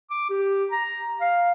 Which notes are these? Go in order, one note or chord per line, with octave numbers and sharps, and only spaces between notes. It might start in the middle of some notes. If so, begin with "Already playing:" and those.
D6
G4
A#5
F5